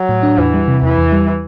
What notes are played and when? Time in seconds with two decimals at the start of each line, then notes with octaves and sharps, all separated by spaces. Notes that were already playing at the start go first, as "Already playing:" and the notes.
Already playing: F#3
0.09 A2
0.23 D4
0.38 E2 E3
0.54 G3
0.68 C3
0.82 E2 E3
0.98 E2
1.12 G3